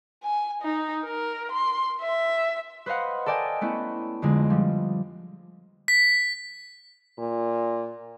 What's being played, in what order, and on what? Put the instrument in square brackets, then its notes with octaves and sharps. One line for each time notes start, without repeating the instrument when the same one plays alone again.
[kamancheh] G#5
D#4
A#4
C6
E5
[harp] B4 C5 D#5 F5 F#5
A4 A#4 D5 D#5 G5 G#5
A3 B3 C#4 E4
F2 D3 G#3
F3 G3
[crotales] B6
[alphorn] A#2